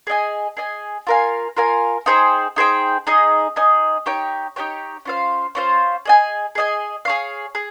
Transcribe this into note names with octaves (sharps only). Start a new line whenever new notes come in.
G#4 D#5 G#5
G#4 D#5 G#5
F4 A#4 F5 G#5
F4 A#4 F5 G#5
D#4 G#4 C5 G5
D#4 G#4 C5 G5
D#4 G#4 D#5
D#4 G#4 D#5
D#4 G4 C#5 G5
D#4 G4 C#5 G5
C#4 F4 C5 F5
C#4 F4 C5 F5
G#4 D#5 G#5
G#4 D#5 G#5
G#4 C#5 F5
G#4